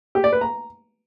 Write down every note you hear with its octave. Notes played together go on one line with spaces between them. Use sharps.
G4
D5
B4
A#5